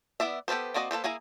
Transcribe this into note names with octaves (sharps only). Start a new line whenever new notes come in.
B3 E4 D5 E5
B3 G4 A4 B4 C5
A#3 C4 F#4 D5 D#5
A#3 A4 B4 C5
A#3 E4 G#4 G#5 A#5